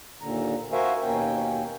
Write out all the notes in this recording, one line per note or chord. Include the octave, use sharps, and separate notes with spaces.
D#2 A#2 D3 A#5
F#4 A#4 C5 E5 F5 G#5
D#2 B2 A#3 C#4 G5